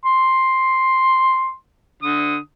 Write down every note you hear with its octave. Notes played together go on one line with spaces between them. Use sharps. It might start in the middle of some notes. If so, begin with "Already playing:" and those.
C6
D3 D#6